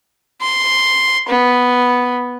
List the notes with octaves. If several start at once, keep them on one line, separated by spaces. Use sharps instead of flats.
C6
B3